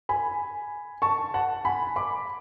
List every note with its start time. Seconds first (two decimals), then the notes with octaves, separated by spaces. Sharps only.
0.09 G#5 B5
1.02 A5 C#6
1.34 F#5 A5
1.65 G#5 B5
1.96 B5 D6